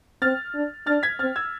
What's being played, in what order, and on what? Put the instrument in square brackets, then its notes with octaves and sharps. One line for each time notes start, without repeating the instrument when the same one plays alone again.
[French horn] C4 [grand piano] F6 A6
[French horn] D4
[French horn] D4 [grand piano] F6 A6
[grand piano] G#6 B6
[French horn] C4 [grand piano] F6 A6
[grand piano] E6 G#6